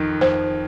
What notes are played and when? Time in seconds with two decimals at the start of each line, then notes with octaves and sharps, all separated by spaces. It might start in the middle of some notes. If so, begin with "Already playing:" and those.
Already playing: F2 D#3
0.21 F2 C5